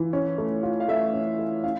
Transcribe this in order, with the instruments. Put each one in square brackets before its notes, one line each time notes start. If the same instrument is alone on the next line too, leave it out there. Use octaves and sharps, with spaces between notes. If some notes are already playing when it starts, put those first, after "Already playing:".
Already playing: [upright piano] E3 F4
C#4
A3
F4
[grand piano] F5
[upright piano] A3 [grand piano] E5
[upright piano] C#4
A3
[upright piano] C#4 [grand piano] F5